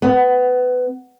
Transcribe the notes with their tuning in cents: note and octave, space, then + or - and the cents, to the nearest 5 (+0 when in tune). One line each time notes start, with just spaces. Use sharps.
B3 +20